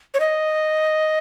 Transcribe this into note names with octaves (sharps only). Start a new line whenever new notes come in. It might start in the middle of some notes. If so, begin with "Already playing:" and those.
C#5
D#5